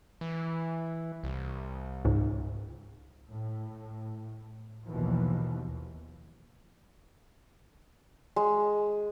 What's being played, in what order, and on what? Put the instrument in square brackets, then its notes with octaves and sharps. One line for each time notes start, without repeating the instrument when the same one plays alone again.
[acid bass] E3
C2
[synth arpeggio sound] C#2 G#2
[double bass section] A2
A#1 D#2 B2 E3 F3
[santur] G#3